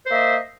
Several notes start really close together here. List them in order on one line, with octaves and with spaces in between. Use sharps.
C5 A#3 E5 D#5